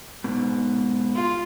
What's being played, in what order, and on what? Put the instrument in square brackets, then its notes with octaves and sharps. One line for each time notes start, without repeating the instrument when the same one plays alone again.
[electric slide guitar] G#2 B2
[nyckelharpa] F4